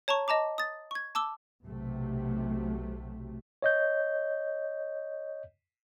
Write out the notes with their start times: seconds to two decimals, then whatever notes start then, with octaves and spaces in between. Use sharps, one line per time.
0.08 C#5 A5 A#5 C#6
0.28 D#5 A5 A#5 D6
0.58 D#6 A6
0.91 C#6 G#6
1.15 A5 D6 E6 G7
1.64 B1 C3 A3
3.62 C#5 D#5 G6